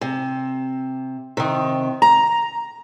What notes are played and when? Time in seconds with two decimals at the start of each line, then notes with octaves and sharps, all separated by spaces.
0.01 C3
1.37 C3 D#3
2.02 A#5